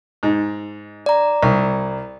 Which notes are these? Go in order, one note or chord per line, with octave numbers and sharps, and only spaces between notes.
G#2
D5 A#5
C2